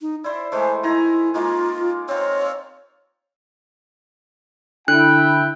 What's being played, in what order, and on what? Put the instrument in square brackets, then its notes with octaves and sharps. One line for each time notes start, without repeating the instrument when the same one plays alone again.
[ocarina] D#4
[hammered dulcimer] E4 C5 [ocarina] D5
[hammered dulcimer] E3 G#3 A3 [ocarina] C5
[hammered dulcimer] D#3 G#5 A#5 [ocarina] E4
[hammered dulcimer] D#3 G#3 A#3 [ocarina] F4
[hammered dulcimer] C4 F4 [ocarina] C#5
[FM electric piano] D3 [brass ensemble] E4 G5 [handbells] F#6